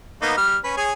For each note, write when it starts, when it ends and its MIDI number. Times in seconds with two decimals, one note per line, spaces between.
0.22 0.35 58
0.22 0.35 59
0.22 0.35 63
0.37 0.56 55
0.37 0.56 89
0.64 0.73 61
0.64 0.73 71
0.77 0.92 68
0.77 0.92 73
0.77 0.92 80